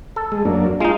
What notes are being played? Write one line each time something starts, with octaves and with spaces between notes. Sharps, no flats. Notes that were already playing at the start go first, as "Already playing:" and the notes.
A4
G#3
F#2 A#3 D4
G#3 D#4 F4